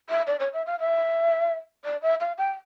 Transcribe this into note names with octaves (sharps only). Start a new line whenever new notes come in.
E5
D5
C#5
E5
F5
E5
D5
E5
F5
G5